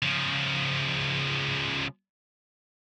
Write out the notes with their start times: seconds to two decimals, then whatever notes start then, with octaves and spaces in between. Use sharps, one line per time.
0.02 C#3 F3